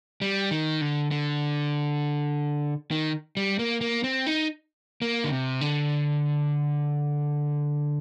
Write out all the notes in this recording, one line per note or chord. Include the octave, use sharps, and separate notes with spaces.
G3
D#3
D3
D3
D#3
G3
A#3
A#3
C4
D#4
A#3
D3
C3
D3